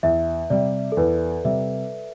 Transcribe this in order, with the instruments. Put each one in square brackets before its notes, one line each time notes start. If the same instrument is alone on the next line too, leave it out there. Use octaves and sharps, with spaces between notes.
[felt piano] E2 [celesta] E5
[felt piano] C3 G3 [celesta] D5
[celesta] A4
[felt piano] E2 [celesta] B4
[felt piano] C3 G3 [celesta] E5